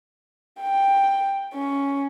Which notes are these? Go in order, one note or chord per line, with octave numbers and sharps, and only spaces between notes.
G5
C#4